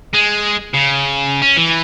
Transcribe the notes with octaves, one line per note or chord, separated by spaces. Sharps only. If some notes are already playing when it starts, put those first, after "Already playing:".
G#3
C#3
C#4
E3